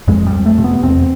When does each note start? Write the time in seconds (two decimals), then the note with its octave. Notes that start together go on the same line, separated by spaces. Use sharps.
0.08 F2 G#3
0.27 G3
0.33 F2
0.46 A3
0.58 C3
0.64 B3
0.83 E2 C4